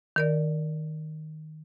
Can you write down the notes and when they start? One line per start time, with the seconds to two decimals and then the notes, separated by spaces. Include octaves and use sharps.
0.16 D#3 A#4 D5